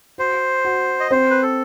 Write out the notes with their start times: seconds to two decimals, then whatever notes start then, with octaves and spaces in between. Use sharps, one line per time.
0.18 F#4 C5
0.65 F#4
1.00 D#5
1.11 C4 C5
1.30 B4
1.42 A4